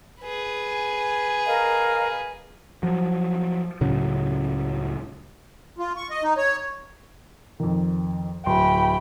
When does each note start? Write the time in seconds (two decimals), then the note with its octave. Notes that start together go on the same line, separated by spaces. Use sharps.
0.22 G#4 B4
1.46 A#4 D#5 F5
2.83 F3 F#3
3.81 C#2 A2 C#3 F#3
5.79 F4
5.96 C#6
6.11 D#5
6.23 D#4
6.37 C#5
7.60 F2 D#3
8.46 D1 G5 B5 C6